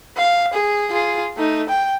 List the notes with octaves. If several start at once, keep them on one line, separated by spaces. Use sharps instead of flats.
F5
G#4
F4 G#4
A3 D#4
G5